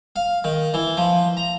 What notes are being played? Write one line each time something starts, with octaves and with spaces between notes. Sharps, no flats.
F5
D#3
E3
F3
A#5